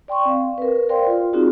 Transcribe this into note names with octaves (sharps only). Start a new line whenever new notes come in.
D5 G5 C6 C#6
C4 F5
A#4 B4
A#4 C5 D5 F5 G5 C6
F4
C4 D#4 F4 F#4 G#4